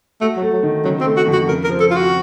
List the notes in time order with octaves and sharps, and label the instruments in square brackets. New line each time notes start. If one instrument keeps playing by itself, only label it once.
[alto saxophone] A3 [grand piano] F#4
[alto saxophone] F#3
[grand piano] A3
[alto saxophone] F#3
[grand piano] D#3
[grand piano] C#3 [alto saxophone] F#3
[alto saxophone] C4
[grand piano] A3
[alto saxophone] F#4
[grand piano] F2
[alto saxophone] F#4
[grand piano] C#3 [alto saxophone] A#4
[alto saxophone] A#4
[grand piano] F3
[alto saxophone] A4
[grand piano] C4 [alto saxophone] F4
[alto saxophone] F#4